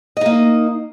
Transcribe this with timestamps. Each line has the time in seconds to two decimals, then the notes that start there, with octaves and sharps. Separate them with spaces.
0.17 D#5
0.21 D#4
0.26 A#3